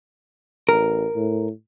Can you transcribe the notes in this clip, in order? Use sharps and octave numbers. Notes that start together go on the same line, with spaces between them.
A1 A#4
A2